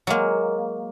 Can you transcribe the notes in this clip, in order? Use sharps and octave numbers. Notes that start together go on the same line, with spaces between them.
F#3 G#3 A#3